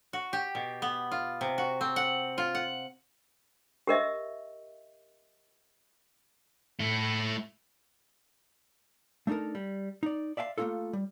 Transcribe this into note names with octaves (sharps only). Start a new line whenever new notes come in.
F#4
G4
B2
B3
F4
C3
F#4
C4
F#5
F4
F#5
G4 A#4 D#5 E5
A3 E4
A3 D4 D#4 A4 A#4
G3
D#4 D5
D5 E5 F5 G5 C6
A3 A#3 C4 C#4 F4 A4
G3